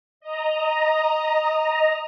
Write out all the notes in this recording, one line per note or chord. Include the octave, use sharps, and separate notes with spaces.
D#5 A#5